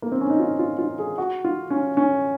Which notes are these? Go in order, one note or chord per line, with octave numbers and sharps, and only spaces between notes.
A#3
C4
C#4
D#4
F4
F4
F4
G#4
F#4
F4
C#4
C#4